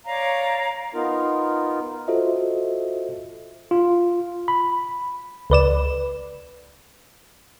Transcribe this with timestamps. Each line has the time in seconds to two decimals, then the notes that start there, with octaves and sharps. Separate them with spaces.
0.06 C#5 D5 F5 A#5
0.94 B3 D#4 F4 A#4
2.08 F4 F#4 A4 C5 D#5 E5
3.71 F4
4.48 B5
5.50 C#2 B4 D5 E7